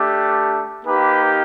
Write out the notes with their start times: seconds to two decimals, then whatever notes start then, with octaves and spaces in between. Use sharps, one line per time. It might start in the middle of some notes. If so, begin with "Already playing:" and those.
Already playing: A3 D4 G4
0.85 A#3 D#4 G4 B4